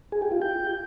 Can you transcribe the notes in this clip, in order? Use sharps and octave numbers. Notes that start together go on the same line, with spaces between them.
G#4
G4
F4
G5